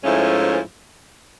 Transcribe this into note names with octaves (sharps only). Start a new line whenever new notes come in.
G#2 F3 A3 C#4 E4